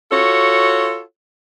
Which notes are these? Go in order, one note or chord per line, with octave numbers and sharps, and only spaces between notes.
F4 F#4 A4 C#5